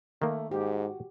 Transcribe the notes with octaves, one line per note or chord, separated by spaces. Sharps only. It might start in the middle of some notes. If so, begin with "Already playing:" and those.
D#3 A3 A#3
G#2 F#4 G4